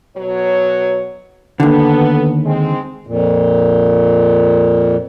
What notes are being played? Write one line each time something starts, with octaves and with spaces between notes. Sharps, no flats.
B2 F#3 C#5
D#2 D3 B3 A4
G#3 C4
F2 A#2